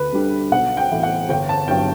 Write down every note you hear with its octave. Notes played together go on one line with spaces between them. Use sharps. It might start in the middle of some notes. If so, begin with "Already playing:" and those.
Already playing: D2 B4
D3 G3 D4
B1 F#5
G5
A2 E3
F#5
G1 G5
A5
G2 F#3 B3 E4 G5